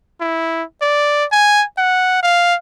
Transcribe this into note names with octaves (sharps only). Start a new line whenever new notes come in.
E4
D5
G#5
F#5
F5